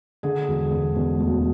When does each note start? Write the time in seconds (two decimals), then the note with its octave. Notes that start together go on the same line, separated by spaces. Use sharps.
0.23 D3 G#4
0.48 E1
0.71 E1
0.96 E1
1.20 D2